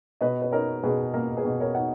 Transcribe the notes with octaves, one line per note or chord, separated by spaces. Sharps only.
B2 B4 D#5
B4
D#4 A#4 C#5
B2 G#4 B4
A#3 A#4
G#4 B4
B2
A#4 C#5
D#4 F#5